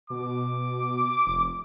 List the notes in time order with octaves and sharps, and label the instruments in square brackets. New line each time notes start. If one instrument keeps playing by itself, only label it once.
[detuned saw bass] B2 [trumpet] D6
[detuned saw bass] F1